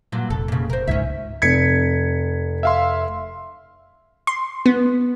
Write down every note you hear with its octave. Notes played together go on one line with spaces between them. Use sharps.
G2 A#2 F#3
F1 A4
A#2 C#3
A#4 C5
C#2 G#2 C#4 E5
F1 G#6 B6 C#7
E5 F5 C6
C6
B3